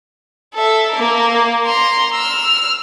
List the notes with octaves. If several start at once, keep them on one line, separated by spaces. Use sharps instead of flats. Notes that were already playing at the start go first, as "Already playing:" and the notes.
A4 E5
A#3 A#4
A#5 C6
E6 F6